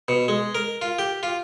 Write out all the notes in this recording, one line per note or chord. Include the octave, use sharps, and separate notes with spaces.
B2
G#3
A#4
F4
G4
F4